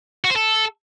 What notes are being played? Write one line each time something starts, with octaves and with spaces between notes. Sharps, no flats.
F#4
C5
A4